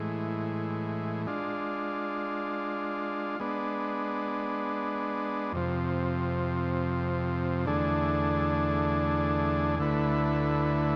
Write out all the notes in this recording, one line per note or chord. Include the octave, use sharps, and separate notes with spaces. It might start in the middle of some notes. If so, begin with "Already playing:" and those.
Already playing: A2 E3 G#3
G#3 D4 F4
G#3 B3 D4
F2 C3 F3
E2 D3 A3 D4 G#4
D2 D3 A3 E4 B4